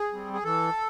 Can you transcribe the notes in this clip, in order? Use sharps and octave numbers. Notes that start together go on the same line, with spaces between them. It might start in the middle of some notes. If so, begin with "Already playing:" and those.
Already playing: G#4
G3 C4
G#4
E3 A4